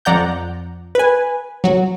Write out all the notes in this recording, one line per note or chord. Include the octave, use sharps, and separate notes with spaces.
F2 F3 D5 F#5 A#5 G6
B4 G#5
F#3 F#4